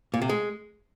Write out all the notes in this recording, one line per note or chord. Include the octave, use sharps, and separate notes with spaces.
A#2
C3
G#3